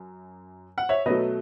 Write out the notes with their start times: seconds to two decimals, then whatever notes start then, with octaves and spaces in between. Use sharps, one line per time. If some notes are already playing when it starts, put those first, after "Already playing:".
Already playing: F#2
0.78 F#5
0.89 C#5 E5
1.06 B2 F#3 A3 B4 D#5